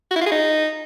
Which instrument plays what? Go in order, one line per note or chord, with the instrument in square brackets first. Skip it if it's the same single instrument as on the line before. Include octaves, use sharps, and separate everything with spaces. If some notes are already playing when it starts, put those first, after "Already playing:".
[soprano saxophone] F#4
E4
F4
G#4
D#4